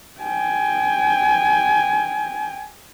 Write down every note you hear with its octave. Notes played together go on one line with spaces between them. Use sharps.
G5 G#5